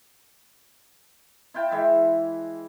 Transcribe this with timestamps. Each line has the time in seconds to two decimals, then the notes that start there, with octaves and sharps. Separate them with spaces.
1.54 E4 F4 G5 A5
1.71 E3 G#3 E4 E5